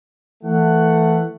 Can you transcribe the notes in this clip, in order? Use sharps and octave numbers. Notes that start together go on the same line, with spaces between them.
E3 A3 F#5